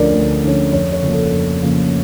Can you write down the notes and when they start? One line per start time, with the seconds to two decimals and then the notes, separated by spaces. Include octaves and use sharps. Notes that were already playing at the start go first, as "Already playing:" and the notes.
Already playing: D2 D3 F3 C#4 A#4 D5
0.13 D2
0.43 D3 F3 C#4
0.72 F2 C#5
0.92 C#5
1.02 C#3 F3 A#3
1.12 A4
1.32 F2
1.62 C#3 F3 A#3